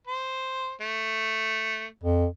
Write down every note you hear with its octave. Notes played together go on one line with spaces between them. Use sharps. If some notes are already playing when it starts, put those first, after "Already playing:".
C5
A3
F2